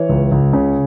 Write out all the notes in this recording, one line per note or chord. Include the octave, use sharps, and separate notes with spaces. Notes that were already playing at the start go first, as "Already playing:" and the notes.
Already playing: E3 C#5
C#2
C#2
C#3